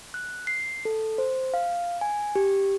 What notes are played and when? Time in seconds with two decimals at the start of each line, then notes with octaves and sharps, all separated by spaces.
0.14 F#6
0.47 C7
0.85 A4
1.18 C5
1.54 F5
2.01 G#5
2.36 G4